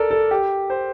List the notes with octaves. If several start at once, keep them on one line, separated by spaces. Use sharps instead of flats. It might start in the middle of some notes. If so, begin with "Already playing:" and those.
Already playing: A4 A#4 D5
A4
G4
C5